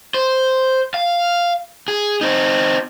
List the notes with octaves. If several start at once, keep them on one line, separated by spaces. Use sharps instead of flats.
C5
F5
G#4
C4 D#4